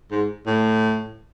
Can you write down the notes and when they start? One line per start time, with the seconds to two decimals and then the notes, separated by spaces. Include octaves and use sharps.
0.11 G#2
0.46 A2